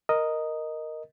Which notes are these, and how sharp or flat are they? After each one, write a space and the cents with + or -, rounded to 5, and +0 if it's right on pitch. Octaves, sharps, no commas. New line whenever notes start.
A#4 +0 D#5 +0